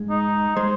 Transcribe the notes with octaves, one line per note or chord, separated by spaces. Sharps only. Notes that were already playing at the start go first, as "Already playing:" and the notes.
Already playing: G#2 G#3
D#4
G#3 C5